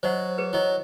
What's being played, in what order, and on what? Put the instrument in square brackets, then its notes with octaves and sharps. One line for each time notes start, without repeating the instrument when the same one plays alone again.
[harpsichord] F#3 [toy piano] C5 D#5 F#5
[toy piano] G#4 B4
[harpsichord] F#3 [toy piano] E4 D#5